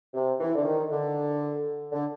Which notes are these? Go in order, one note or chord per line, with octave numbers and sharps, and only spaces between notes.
C3
E3
D3
D#3
D3
D3